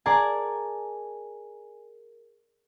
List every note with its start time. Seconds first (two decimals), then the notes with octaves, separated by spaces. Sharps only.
0.06 G#4 A#4 D5 G#5 A5